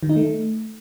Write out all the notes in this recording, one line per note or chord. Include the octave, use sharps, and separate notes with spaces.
D#3
D#4
A3